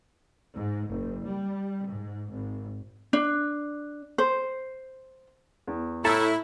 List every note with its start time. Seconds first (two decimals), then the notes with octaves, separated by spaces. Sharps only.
0.54 G#2
0.91 F#1
1.28 G3
1.87 G#2
2.31 G#1
3.13 D4
4.18 C5
5.67 E2
6.05 A2 E4 A4 A#5 E6